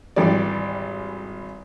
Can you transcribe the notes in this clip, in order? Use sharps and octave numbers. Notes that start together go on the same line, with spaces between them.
G#1 E3 G3 D5